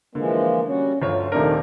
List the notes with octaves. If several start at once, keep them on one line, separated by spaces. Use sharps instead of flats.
D3 E3 F3 G#3 A#3
G3 C#4 F#4
G1 D2 F4 C#5
D#1 C3 D#3 A3 D4 A#4